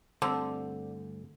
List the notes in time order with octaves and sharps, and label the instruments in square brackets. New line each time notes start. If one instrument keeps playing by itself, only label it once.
[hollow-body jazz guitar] D2 G2 C4 [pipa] D3 [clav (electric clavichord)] A4